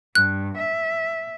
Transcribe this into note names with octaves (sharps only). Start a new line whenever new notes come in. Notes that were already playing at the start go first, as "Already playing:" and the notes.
G2 F#6
E5